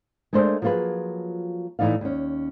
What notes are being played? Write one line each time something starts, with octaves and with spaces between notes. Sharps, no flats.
G#3 A3 D4 A#4 C5
F3 F#3 A#3 F4 G#4 B4
A2 E3 D#4 D5 F5
D#2 C#4